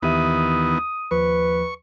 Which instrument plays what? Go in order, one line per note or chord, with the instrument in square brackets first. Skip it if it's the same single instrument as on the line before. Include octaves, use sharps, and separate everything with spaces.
[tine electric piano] D#2 G4 E5 [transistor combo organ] D#3 E3 B3 [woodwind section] D#6
[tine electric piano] D#2 F3 [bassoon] B4 [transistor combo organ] C#6